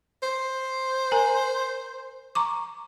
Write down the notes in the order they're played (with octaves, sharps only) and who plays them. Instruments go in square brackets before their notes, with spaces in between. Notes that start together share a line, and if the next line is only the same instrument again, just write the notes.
[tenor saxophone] C5
[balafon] A#4 G#5 A#5
A#5 C#6 D6